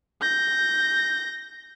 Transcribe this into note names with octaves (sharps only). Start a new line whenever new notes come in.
G6 A#6